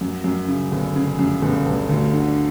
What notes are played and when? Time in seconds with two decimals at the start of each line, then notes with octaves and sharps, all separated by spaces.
0.01 F#2
0.24 F#2
0.48 C#3
0.72 G1
0.96 C#3
1.19 F#2
1.42 G1
1.66 G1
1.89 D2
2.13 D3